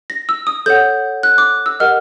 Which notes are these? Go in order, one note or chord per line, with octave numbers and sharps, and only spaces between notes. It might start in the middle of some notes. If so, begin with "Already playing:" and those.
A#6
E6
D#6
A4 C#5 F#5 G6
F#6
D6
E6
G4 A#4 D#5 F#5 F6